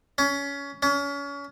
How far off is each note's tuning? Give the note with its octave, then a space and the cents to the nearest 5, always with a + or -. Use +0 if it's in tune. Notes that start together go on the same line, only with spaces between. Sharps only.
C#4 +25
C#4 +35